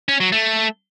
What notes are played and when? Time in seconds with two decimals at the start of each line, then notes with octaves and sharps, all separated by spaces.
0.09 C#4
0.20 F#3
0.32 A3